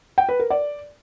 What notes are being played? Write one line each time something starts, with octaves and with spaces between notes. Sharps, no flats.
G5
B4
A#4
D5